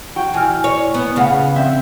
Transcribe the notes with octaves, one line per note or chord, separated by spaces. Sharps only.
F#4 G5
E3 G#5 F6
C#5
B3
C#3 B4 F5 F#5
C4 E5